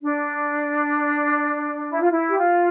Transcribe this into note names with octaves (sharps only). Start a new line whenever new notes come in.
D4
E4
F4
E4
G4
F4